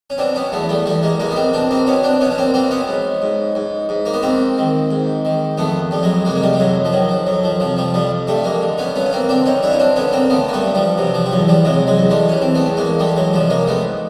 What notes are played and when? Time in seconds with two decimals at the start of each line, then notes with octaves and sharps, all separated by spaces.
0.10 C#4
0.18 B2 C4 D4
0.35 B3 C#4
0.52 E2 A3 B3
0.69 G3 A3
0.86 E2 G3 A3
1.03 G#3 A#3
1.20 B2 G#3 A#3
1.31 B3
1.36 A#3 C4
1.53 B2 C4 D4
1.71 A#3 C4
1.87 B2 B3 C#4
2.04 C4 D4
2.21 B2 B3 C#4
2.31 C#4
2.38 A#3 C4
2.54 B2 A#3 C4
2.71 B3 C#4
2.88 G#2
3.22 G#2
3.55 G#2
3.89 G#2
4.06 A#3
4.14 B3
4.23 G#2 A#3 C4
4.58 D#3
4.91 G#2
5.25 D#3
5.58 F2 A3 B3
5.91 F2 G3
6.03 F#3 G#3
6.25 C3 G#3 A#3
6.35 A#3
6.42 G3 A3
6.53 G3
6.59 F2 F#3 G#3
6.85 F3
6.92 D#3 F#3
7.09 F3
7.27 F2 F#3
7.44 F3
7.60 C3 F3
7.77 F3 G3
7.94 F2 F3 G3
8.27 G2 G3 A3
8.44 G#3 A#3
8.62 D3
8.78 B3 C#4
8.95 G2 B3 C#4
9.05 C#4
9.13 A#3 C4
9.28 D3 C4 D4
9.46 C#4 D#4
9.63 G2 D4 E4
9.71 C#4
9.80 C4 D4
9.96 D3 B3 C#4
10.13 A#3 C4
10.30 D3 A3 B3
10.49 A#3
10.53 G3 A3
10.63 G2
10.75 F3 G3
10.98 C3 F#3
11.15 F3
11.26 G3
11.32 E2 F#3
11.48 F3 G3
11.65 C3 F#3 G#3
11.87 F#3 G#3
11.98 E2
12.10 G3 A3
12.29 E3 C#4
12.42 C4
12.55 A3 B3
12.66 E2
12.77 G#3 A#3
12.99 E2 G3 A3
13.16 F#3 G#3
13.33 C3 F3 G3
13.50 G#3 A#3
13.67 G#2 A3 B3